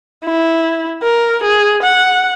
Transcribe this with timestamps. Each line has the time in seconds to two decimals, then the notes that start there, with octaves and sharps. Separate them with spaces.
0.25 E4
1.03 A#4
1.43 G#4
1.82 F#5